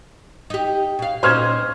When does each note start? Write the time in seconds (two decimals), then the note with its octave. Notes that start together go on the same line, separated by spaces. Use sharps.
0.50 D#4 G4
0.99 B2 F5
1.23 A#2 C#4 D#4 C5 F6 G#6